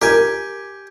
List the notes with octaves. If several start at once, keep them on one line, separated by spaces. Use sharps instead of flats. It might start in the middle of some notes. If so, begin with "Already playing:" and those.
G4 A#4 G#5